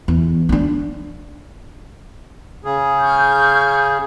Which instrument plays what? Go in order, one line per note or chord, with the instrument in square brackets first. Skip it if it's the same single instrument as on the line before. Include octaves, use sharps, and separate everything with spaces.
[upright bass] E2
C#4 D4
[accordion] C#3 G#4
[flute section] C#6 F6 G6